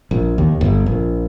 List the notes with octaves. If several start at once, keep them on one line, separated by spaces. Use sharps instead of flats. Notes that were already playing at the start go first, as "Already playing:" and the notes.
A#1
D#2
G1
A#1